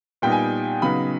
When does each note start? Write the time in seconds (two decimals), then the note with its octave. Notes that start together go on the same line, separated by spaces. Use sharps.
0.22 A#2 G3 B3 D#4 G5
0.32 G#5
0.82 C#3 F#3 B3 D#4 B5